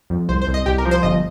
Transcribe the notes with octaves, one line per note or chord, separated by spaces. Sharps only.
F2
C2 C5
C5
C2
D#5
C2 G4
A#4
F3
C5
G1 D#5